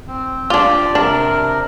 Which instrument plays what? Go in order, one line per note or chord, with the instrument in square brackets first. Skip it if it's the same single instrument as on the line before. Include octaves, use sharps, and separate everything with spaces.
[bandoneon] C4
[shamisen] D4 F4 [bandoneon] G4 D5
[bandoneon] C3 A#4 [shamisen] D4